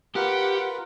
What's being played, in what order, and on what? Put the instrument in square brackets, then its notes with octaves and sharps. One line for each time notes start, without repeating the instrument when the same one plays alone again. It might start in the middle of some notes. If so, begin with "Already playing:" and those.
[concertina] F4 A#4 B4 [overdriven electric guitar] G4 [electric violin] F#5 D6